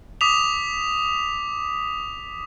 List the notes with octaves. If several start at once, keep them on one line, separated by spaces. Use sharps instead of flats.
D6 D#6 B6 F7